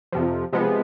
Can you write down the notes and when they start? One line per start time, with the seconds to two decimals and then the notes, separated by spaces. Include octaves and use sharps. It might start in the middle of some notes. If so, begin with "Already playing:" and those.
0.13 F2 C3 F3
0.52 C3 F3 G#3 B3